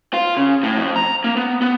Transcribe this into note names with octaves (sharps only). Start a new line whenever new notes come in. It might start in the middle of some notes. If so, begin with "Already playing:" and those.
F4
C#3
A2
F2
A#5
A#3
B3
B3